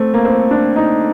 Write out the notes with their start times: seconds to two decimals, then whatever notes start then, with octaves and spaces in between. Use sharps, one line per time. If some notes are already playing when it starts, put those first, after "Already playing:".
Already playing: A3 C4
0.14 A#3
0.25 C4
0.51 D4
0.76 D#4